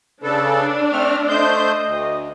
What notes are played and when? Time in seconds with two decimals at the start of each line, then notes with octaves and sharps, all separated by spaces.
0.24 C#3 D4 A4 B4
0.92 A3 C4 F6
1.28 A3 C5 D#5 G6
1.85 D2